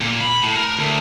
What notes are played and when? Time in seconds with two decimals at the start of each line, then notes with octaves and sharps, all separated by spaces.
0.01 A#2
0.21 B5
0.42 A2
0.56 A#4
0.79 D2